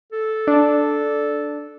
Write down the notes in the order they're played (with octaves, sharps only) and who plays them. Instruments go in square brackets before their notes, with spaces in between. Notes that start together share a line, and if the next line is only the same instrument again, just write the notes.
[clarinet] A4
[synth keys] D4